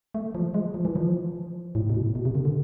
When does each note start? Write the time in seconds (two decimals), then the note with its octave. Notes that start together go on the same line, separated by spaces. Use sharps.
0.14 A3
0.35 F3
0.54 G#3
0.74 F3
0.85 E3
0.96 F3
1.75 A2
1.90 B2
1.95 A2
2.15 B2
2.25 C3
2.35 D3
2.45 D3